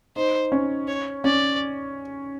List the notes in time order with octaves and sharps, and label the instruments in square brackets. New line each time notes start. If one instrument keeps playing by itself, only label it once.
[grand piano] D#4 [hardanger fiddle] C5
[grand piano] C#4
[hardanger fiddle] C#5
[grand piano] C#4 [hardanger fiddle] D5